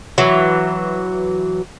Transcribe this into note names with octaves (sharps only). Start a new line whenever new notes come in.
E3 F#3